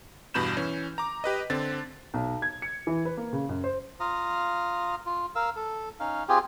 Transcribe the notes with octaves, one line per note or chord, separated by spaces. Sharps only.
E2 G2 B2 B5 G6 E7
E3 C#4
A#5 D6
G4 B4 D#5
D3 C4 A6
B1
G#6
C#7
E3
B4
A#3
C#3
F#2
C5
F4 F5 A#5 D#6
F4
A#4 F5 E6
A4
C#4 D#4 F5
C4 F4 G4 G#4